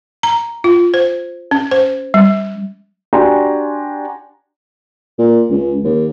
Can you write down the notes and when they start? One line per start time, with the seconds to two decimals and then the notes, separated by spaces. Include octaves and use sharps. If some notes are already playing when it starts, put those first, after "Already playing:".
0.23 A#5
0.64 F4
0.94 C5
1.51 C#4
1.71 C5
2.14 G3
3.13 D4 F#4 G4 G#5 A#5 C6
5.19 A#2
5.50 C#2
5.84 D#2